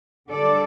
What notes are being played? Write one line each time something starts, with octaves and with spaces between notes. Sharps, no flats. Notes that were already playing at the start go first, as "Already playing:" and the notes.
D3 G3 A4 D5